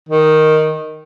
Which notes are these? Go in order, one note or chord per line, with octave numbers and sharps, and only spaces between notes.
D#3